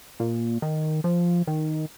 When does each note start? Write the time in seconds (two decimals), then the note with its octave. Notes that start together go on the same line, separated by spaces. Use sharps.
0.20 A#2
0.62 D#3
1.04 F3
1.47 D#3